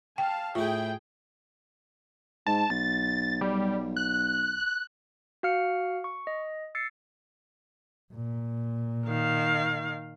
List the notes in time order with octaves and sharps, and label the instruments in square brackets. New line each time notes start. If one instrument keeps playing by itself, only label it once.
[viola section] F5 A5 [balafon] G5
[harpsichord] A2 E4 [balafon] F4 [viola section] G#4 G5
[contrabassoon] G#2 [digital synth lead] A5
[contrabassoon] B1 [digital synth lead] A6
[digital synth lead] G3
F#6
[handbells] F#4 F5 F6 C#7
C#6
D#5
E6 A6 C7 C#7
[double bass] A#2
[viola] D#3 F5